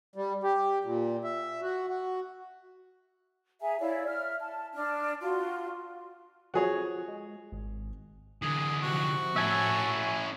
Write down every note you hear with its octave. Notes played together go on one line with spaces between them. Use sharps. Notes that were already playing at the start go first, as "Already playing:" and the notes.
G3
G4
A#2
E5
F#4
F#4
G#4 E5 G#5 A#5
E4 C#5 D5 F5
E5 F6
A5
D4 F6
F4 F#4 C6
F3 F#4 G#4 C#5
G#3
G#1
D3 E3 G#4
C3 F3 F#4
A2 C#4 E4 E5 G#5 A5